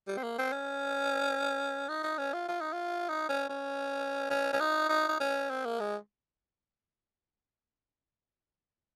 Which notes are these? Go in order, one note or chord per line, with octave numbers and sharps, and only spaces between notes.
G3
C4
A#3
C4
C#4
D#4
D#4
C#4
F4
F4
D#4
F4
D#4
C#4
C#4
C#4
C#4
D#4
D#4
D#4
C#4
C4
A#3
G#3